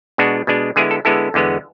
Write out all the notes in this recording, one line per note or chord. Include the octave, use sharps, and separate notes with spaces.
B2 G#3 D4 F#4
B2 G#3 D4
D3 G#3 B3 E4 G#4
A4
D3 G#3 B3 E4 A4
E2 D3 G#3 B3